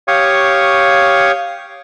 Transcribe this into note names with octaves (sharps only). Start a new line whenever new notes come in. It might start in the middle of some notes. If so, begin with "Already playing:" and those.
G4 C#5 F5 C#6 D#6